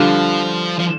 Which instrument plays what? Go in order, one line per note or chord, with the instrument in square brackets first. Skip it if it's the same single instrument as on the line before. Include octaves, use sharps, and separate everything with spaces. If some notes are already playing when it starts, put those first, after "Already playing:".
Already playing: [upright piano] D3 G3 D4 F4 [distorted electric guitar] F3
[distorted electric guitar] F3